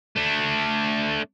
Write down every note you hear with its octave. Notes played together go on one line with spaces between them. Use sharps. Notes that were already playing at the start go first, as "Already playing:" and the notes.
A3 D4